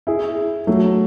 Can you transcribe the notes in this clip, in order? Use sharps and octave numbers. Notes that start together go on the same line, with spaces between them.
E4 G#4
F#3 A3